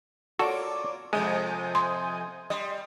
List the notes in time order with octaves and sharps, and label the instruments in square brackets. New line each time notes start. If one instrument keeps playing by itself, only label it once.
[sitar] A#3 F4 [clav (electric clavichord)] F#4 A4 [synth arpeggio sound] C#5 D5 D6
[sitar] F2 G#2 C3 [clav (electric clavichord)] G#3 [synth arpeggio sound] G#5 D#6 G6
[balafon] C6
[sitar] G3 [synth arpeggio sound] D#5 C6